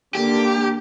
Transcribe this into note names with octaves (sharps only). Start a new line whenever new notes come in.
D3 A#3 D4 G4